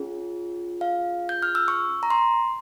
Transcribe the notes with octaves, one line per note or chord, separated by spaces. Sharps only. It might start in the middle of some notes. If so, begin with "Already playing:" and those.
Already playing: C#4 F4 G#4
F5
G6
F6
E6
C#6
A#5
C6